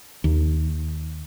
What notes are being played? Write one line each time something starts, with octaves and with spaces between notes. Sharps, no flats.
D#2